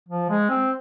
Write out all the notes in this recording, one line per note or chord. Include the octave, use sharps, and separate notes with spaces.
F3
G#3
C4